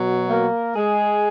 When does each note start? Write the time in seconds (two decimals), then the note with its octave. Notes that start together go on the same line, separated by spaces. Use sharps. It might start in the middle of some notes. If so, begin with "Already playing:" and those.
Already playing: B2 F#3
0.28 A#3 A#4
0.75 G#3 G#4